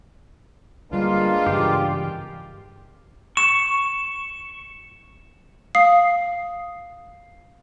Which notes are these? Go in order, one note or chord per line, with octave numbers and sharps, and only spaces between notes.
D2 G3 G#3 A#3 B3 D4 F4
G2 C#3 E3 G4
C#6 E7
F5 D#6 C7